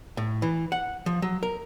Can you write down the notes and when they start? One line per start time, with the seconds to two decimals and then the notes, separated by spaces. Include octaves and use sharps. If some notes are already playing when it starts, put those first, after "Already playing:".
0.17 A2
0.42 E3
0.72 F#5
1.06 F3
1.22 F#3
1.43 A#4